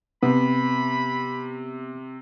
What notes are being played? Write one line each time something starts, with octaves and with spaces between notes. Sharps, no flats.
C3 B3 B5